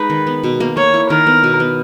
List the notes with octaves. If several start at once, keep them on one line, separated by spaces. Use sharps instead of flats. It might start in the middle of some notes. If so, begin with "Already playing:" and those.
Already playing: G#3 D#4 B4
D#3
B3
B2
A#3
A#3 C#5
E4
D#3 A#4
B3
B2
B3